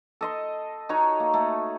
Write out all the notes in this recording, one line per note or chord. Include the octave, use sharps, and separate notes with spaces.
A4 D#5 C6
D#4 F#4 C#5
A#3
A3